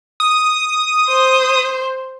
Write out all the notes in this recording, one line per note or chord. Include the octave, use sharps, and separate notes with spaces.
D#6
C5